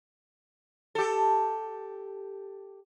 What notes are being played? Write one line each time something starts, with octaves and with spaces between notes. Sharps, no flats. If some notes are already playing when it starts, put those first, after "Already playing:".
G4 A4